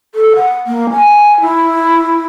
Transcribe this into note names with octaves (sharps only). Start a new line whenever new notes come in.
A4
F#5
A#3
G#5
E4